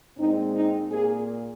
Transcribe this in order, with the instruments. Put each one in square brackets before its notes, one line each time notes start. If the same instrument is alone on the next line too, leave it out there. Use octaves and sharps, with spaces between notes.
[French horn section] A#2 G#3 C4 D#4
D#4
A#2 A#3 G#4